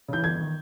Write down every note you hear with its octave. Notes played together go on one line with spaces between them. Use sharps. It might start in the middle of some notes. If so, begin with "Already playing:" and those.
C#3 E3 G6
G1 G#6
D#3